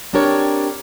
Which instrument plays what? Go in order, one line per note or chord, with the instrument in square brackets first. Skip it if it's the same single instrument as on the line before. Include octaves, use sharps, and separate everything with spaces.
[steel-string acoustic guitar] C4 D4 G4 A#4 C#5 D5